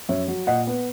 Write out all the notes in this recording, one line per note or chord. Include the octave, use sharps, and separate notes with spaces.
F#2 C#5 E5
F#3
A#2 D#5 F#5
B3